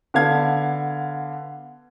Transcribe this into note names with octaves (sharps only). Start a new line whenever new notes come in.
D3 B3 F5 G#6